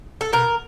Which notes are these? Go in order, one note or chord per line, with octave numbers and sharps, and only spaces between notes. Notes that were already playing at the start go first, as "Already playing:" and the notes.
A4
B2 A#4